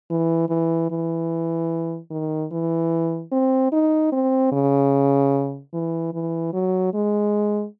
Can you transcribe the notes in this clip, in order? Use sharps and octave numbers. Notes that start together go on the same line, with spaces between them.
E3
E3
E3
D#3
E3
C4
D#4
C4
C#3
E3
E3
F#3
G#3